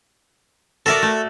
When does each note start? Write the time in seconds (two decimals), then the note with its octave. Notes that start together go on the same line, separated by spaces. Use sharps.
0.86 F#4 A4 A#4 D5 E5
1.03 A3